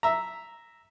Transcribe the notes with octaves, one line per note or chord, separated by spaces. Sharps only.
E5 A#5